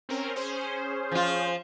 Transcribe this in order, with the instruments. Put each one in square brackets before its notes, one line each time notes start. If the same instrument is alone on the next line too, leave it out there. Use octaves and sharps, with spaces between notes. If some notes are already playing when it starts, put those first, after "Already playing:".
[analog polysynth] C4 C#4 A#4
C#4 G#4 C5
[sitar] F3 F4